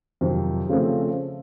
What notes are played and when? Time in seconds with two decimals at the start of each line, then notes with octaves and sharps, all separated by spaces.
0.21 F2 C3 D#3 F#3
0.69 C#3 F3 A3 C4